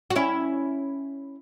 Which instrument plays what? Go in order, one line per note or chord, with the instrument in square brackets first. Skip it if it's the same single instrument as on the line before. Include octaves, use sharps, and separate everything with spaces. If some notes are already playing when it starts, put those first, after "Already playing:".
[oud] F#4
C#4 E4